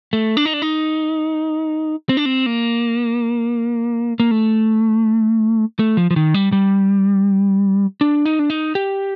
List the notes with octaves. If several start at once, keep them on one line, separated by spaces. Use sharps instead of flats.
A3
D4
D#4
D4
D#4
C4
D4
C4
A#3
A#3
A3
A3
F3
F3
D#3
G3
G3
D4
D#4
D4
D#4
G4